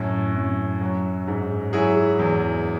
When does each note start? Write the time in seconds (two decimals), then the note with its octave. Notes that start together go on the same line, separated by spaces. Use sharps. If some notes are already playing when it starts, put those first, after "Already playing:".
Already playing: F#2 A2
0.35 F#2
0.81 F#3
1.28 G#2
1.73 F#3 E4 G#4
2.19 E2